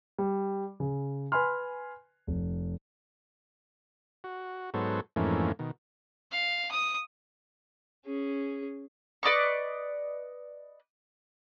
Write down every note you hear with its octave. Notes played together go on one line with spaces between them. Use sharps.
G3
C#3
B4 G#5 B5 C6 F6
F1
F#4
G#2 F#3 B3 A4 C5 C#5
F2 G#2 E3 A3 A#3 C#4
B2 D#3
F5
D#6
C#4 G#4
B4 D5 D#5 C#6